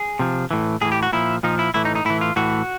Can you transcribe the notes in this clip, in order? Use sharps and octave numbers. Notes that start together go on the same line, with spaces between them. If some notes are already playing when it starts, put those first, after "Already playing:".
Already playing: G#4
C3 F3
A2 E3
A2 E3 G#4
G4
F#4
A#2 F3 E4
A#2 F3 D#4
E4
A2 E3 E4
D#4
D#4
A2 E3 E4
F4
A2 E3 F#4